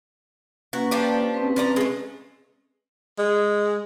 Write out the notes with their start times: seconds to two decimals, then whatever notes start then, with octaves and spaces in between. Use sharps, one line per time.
0.73 A#3 C#4 F#4 B4
0.91 F3 D4 G4
1.34 C4 C#4 B4
1.56 F3 D5 A#5
1.76 G#3 A3
3.19 G#3